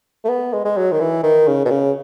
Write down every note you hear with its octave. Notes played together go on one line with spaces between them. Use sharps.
A3
B3
G#3
G#3
F#3
D#3
E3
D#3
C#3
B2
C#3